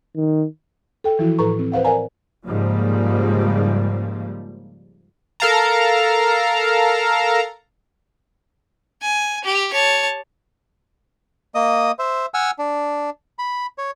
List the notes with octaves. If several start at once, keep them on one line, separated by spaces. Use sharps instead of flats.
D#3
A4 G5
E3 F3 E4 F#4
A2 F3 A4 B4 A#5 C#6
C4
B4 C5 F5 F#5
A#4 D5 F5 G#5 A#5
G#2 C#3 F3 G3 A#3
A4 A#4 F5 A5 A#5
G#5
G4
C#5 A5
A#3 D#5 D#6
C5 E5
F#5 G#5 E6 F6
D4
B5
C#5